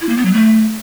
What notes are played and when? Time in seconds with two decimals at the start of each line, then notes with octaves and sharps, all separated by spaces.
0.01 E4
0.09 A#3
0.17 B3
0.25 F#3
0.33 A3